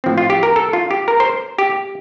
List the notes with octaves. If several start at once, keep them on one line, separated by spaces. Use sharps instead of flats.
A2 F3 C4
F4
G4
A#4
A4
F4
G4
A#4
C5
G4